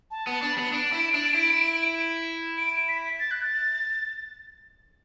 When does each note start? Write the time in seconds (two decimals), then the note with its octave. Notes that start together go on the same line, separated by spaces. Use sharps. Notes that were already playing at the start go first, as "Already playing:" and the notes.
0.11 A5
0.27 B3 A5
0.42 D4
0.52 B5
0.58 B3
0.73 D4 D7
0.93 E4
1.14 D4
1.35 E4
2.58 D7
2.88 B6
3.20 A6
3.31 F#6
3.42 A6